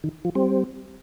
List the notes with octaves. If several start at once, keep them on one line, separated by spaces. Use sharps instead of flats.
D#3
F3
G3 C4